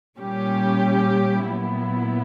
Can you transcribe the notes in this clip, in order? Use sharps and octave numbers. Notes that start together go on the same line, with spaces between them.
A#2 G3 C#4 G4
A#2 F#3 B3 E4